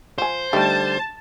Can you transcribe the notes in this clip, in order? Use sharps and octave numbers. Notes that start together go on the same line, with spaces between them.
F3 C5 G#5
D3 G3 A3 D#4 G4 A5